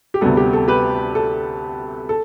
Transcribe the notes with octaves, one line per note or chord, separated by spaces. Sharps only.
G4
D2 C3 G3 B3 A4
G4
A4
G4 B4
A4
A4